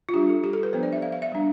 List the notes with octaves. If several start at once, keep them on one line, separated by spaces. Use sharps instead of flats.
F4
G3 D4 G4
A4
G4
A4
B4
F3 B3 D4 C5
D5
E5
F5
F5
E5
G3 D4